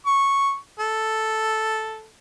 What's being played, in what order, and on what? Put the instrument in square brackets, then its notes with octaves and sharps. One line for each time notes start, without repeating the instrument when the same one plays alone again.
[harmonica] C#6
A4